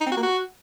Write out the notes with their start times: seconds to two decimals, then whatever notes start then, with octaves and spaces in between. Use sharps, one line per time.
0.01 D#4
0.06 C4
0.12 F#4
0.17 A#3
0.22 F#4